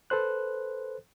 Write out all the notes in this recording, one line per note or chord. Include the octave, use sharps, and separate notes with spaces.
A4 B4 C5 F#6